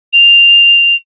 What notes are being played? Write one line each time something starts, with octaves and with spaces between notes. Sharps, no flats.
F7